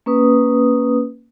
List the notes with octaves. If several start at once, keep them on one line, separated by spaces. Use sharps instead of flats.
A#3 C#4 B4 D#6